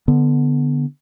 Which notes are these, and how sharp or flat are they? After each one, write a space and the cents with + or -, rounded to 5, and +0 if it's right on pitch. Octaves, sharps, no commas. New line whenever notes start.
D3 +0 B3 -5